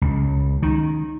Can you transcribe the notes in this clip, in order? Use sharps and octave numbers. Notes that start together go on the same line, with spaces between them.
C#2
D#3